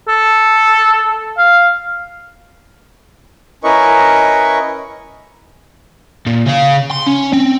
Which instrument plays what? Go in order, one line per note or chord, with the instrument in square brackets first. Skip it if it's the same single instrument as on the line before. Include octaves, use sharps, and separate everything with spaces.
[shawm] A4
F5
[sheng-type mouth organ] C#4 E4 A#4 B4 D#5 C#6
[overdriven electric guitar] A#2
C#3 F5
C6
C#4
C4